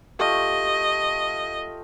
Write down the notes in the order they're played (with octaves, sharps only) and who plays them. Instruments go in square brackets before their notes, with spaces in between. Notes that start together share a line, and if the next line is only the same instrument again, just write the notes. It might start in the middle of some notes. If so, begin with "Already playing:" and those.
[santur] A3 F4 G4 [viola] D#5